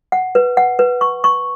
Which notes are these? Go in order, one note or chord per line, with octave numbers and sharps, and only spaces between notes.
F#5
B4
F#5
B4
C#6
C#6